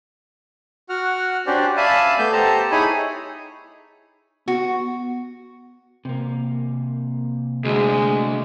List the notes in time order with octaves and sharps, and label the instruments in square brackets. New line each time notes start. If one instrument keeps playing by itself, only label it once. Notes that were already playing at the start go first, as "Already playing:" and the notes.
[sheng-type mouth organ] F#4 F#5 F6
C#4 D4 F#4 G4 C5 D5
D5 E5 F5 G#5 A5 B5
A3 B3 G6
G4 A4 C5 A5 A#5
D#4 E4 G#4 C#5 G#5 B5
[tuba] B3 [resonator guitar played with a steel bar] F#4
[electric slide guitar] C3 A#3
[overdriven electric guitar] D2 [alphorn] G#3